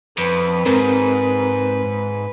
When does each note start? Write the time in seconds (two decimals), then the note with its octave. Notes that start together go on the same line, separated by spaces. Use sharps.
0.18 F2 B4
0.66 G#2 C4 A#4